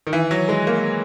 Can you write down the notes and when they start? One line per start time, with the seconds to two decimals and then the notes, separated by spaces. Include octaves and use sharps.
0.07 D#3
0.13 E3
0.31 F#3
0.49 G#3
0.67 A#3